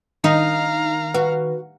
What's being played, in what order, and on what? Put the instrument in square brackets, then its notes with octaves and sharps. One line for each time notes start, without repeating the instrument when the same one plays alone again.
[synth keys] D#3 [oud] D#4 [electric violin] F5 A#5
[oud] F#4 [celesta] B4